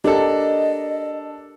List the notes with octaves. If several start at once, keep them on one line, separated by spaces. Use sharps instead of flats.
D4 G4 A4 A#4 D#5